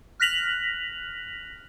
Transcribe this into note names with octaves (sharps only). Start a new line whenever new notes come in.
F6 F#6 A#6 B6 F7 F#7